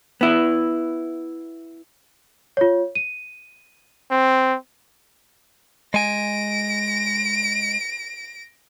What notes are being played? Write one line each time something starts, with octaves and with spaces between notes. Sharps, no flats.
B3 E4
F4 C#5
D#7
C4
G#3 G#5 A#6 D7